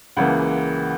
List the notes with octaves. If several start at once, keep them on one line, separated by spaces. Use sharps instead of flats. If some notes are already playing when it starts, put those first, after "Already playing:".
C#2 C#3 E3 A#3 F#5